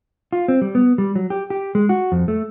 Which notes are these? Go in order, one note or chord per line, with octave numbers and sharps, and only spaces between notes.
F4
C4
G3
B3
G3
F#3
G4
G4
G#3
F#4
F2
A3